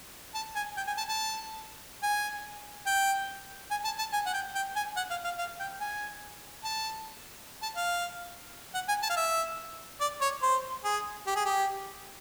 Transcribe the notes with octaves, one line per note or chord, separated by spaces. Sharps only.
A5
G#5
G5
G#5
A5
A5
G#5
G5
G#5
A5
A5
G#5
F#5
G5
G5
G#5
F#5
F5
F5
F5
G5
G#5
A5
A5
F5
F#5
G#5
A5
F5
E5
D5
C#5
C5
G#4
G4
G#4
G4